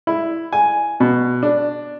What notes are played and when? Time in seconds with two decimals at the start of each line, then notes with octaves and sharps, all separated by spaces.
0.07 E4
0.53 G#5
1.00 B2
1.43 D4